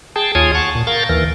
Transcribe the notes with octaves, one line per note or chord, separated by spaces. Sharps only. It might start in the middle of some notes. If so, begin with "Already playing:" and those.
G#4 G5 A5
D#2 F4 G#4 C#5 G#5 D#6
F#5 A5 C#6
A#2
A#4 F5 C#6 G6 A6
D#2 E3 A#4